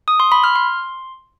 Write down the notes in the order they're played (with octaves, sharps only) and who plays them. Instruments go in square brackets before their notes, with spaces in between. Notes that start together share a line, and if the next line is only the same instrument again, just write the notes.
[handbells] D#6
C6
B5
F6
C6